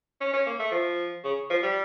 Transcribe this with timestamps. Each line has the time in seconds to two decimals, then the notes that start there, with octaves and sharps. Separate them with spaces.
0.21 C#4
0.34 C#4
0.46 A#3
0.59 A3
0.72 F3
1.24 C#3
1.50 F3
1.63 G3